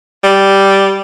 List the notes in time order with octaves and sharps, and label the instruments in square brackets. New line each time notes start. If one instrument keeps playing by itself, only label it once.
[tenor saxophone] G3